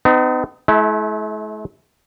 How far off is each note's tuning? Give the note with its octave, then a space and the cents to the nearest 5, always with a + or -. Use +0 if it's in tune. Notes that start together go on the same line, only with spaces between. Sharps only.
B3 +45 D#4 -10
A3 -45 E4 -15